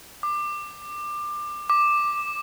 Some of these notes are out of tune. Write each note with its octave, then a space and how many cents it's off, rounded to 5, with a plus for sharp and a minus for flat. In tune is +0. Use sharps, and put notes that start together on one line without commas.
D6 +20
D6 +10